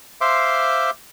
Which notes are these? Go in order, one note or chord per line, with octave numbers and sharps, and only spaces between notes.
C5 E5 F5 C6 D6